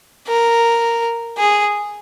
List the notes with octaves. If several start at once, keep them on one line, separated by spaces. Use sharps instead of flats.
A#4
G#4